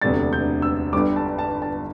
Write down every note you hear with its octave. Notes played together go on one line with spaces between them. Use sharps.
E1 D2 C3 A3 D4 A6
G6
E6
G1 G2 D3 G3 D6
A5
A5
A5